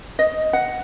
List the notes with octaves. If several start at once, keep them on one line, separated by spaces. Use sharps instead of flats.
D#5
F#5